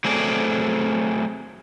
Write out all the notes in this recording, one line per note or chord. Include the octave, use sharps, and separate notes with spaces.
F#3 A3 C4 G#4 D5